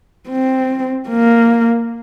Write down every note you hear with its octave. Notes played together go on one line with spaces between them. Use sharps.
C4
A#3